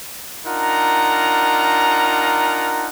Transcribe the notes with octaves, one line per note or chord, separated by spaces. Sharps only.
D4 D#4 F4 A#4 F#5 A#5